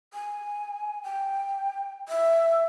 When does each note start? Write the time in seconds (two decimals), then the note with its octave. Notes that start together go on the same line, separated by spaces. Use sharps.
0.14 G#5
1.03 G5
2.09 E5